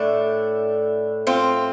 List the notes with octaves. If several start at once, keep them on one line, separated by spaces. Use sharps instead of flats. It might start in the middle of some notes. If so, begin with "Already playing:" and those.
Already playing: A2 A3 D4
C4 F4